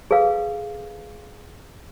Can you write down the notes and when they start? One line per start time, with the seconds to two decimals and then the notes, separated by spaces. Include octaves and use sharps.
0.11 G#4 A4 B4 F5